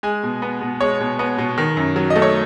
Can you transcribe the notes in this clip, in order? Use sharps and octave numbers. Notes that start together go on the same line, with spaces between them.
G#3 G#5
B2
B3
B2
G#3 C#5
B2
B3
B2
D#3
F#2
F#3
D#5
A3
C#5